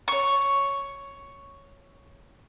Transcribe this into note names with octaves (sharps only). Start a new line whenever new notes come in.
C#5 C#6